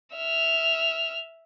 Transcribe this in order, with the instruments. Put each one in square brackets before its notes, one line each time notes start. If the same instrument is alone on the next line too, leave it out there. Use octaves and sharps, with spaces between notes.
[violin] E5 F6